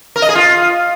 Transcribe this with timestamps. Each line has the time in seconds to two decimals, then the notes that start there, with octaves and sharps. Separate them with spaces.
0.16 A#4
0.22 D#5
0.29 G#4
0.35 F4